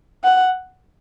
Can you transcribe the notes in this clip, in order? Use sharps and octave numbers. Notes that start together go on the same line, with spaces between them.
F#5